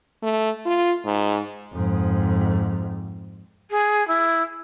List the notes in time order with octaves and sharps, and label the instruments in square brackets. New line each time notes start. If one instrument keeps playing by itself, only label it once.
[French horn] A3
F4
G#2
[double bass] F2 G#2
[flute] G#4
E4